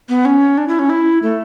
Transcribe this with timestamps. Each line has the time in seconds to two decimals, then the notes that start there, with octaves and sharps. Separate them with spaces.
0.09 B3
0.25 C#4
0.58 D4
0.68 E4
0.79 C#4
0.90 E4
1.23 A3